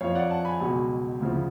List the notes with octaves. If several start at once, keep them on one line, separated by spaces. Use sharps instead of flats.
F2 F3 C#5 F5
D5 F#5
F#5 A5
G#5 B5
C#2 B2 F#3 G#5 B5
D2 C#3 F3